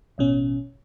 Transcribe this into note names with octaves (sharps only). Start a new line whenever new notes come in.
A1 B2 C#4